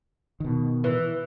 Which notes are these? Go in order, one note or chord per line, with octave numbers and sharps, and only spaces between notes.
B2 D#3
E3